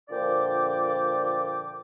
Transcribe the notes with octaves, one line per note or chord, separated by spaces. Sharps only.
A#2 D3 F3 D5 G5 D6